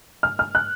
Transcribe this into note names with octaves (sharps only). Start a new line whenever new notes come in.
F6
F6
F#6